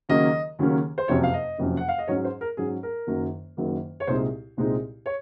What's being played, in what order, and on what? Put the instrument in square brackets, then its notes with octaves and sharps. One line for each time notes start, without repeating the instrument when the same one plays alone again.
[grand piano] D#2 C#3 F#3 A#3 C#4 D#5
D#2 C#3 F#3 A#3 C#4
C5
F#1 F2 C3 F#3 C#4 C#5
F5
D#5
F#1 F2 C3 F#3 C#4
F#5
F5
D#5
G#2 F#3 C#4 C#5
C5
A#4
G#2 F#3 C#4 G#4
A#4
F#1 F#2 D#3 F#3 A#3
F#1 F#2 D#3 F#3 A#3
C#5
C2 A#2 G#3 C4 D#4 C5
C2 A#2 G#3 C4 D#4
C#5